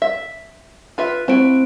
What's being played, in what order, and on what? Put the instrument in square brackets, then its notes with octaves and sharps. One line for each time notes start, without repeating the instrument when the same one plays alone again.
[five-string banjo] E5
F4 B4 E5
[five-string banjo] A3 E4 F#4 [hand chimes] C4 C5 D7